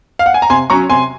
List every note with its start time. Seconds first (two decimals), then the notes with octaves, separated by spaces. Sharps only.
0.19 F5
0.26 F#5
0.34 G#5
0.42 A#5
0.50 C3 G#5 C6
0.70 F#3 C#4 A#5 C#6
0.89 C3 G#5 C6